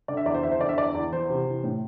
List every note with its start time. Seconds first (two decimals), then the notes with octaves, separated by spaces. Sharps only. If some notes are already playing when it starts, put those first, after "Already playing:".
0.08 D3 D5
0.17 E5
0.26 E2 D5
0.34 C5
0.43 E2 E5
0.51 C5
0.60 D3 D5
0.69 E5
0.77 E2 D5
0.94 E2
1.12 E3 C5
1.30 C3
1.46 E3
1.64 A2